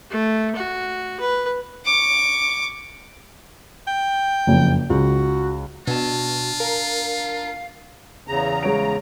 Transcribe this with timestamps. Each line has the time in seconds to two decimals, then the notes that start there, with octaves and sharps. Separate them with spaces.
0.10 A3
0.56 F#4
1.20 B4
1.86 C#6 D6
3.87 G5
4.47 F#1 F2
4.90 C#2 F#4
5.87 B2 D4 F4 F#4 A5
6.60 A#4 F5
8.28 E2 C#3 A#5
8.63 G#3 C#5 D7